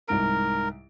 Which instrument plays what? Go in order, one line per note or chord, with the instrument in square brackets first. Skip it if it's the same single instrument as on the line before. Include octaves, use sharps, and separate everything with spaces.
[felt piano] C2 G#2 D7 [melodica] A#4